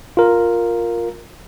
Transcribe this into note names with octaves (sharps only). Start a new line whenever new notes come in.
F4 A#4